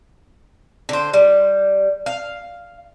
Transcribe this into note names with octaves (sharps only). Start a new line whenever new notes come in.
D3 C5
G3
F5